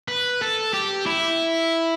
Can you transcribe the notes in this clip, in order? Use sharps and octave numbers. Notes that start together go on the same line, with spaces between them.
B4
A4
G4
E4